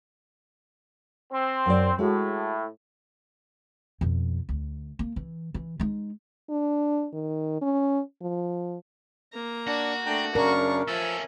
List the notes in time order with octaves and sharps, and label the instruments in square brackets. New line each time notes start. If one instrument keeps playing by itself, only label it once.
[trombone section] C4
[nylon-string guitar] F#2 D5
[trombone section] A2 [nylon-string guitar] G#3 F#4
[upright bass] F2 B2
D2
A#3
E3
E3
G#3 D#4
[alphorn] D4
D#3
C#4
F3
[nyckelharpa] A#3 A#5
[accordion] D4 [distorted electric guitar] F#4
[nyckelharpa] A3 D4 [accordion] G5 A#5
[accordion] F#2 C#3 D4 [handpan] A#4 [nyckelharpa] A#5 C#6
[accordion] F3 E6 [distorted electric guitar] C#4 A4 [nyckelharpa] E5 G#5